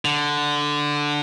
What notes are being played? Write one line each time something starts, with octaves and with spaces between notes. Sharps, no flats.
D3